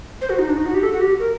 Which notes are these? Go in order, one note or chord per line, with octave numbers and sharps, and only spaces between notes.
C5
F#4
D#4
D4
D#4
F#4
G4
A4
F#4
G4
A#4